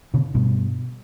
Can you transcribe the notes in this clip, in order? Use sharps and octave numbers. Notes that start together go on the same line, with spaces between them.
B2 D3
G2 B2